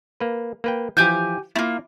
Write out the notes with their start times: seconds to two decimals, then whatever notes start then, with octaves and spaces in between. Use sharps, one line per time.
0.20 A#3 B4
0.64 A#3 B4 G5
0.97 E3 F3 G4 G#5 G6
1.56 A3 A#3 E4 F4